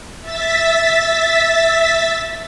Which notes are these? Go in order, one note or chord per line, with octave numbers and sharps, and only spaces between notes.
E5 A6 B6